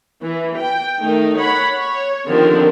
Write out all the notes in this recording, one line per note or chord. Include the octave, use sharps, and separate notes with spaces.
E3
G5
D#3 A3 D#4
C#5 F#5 B5
C#5
D3 D#3 F3 C4 G4 A#4